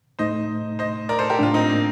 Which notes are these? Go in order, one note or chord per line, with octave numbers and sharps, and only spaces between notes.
A2 A3 D#4 C5 D#5
C5 D#5
A#4 D5
A4 C5
G4 A#4
A2 A3 D4 F4
C4 D#4
A#3